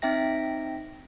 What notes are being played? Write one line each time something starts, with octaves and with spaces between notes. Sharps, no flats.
C4 D#4 E5 G5 A#6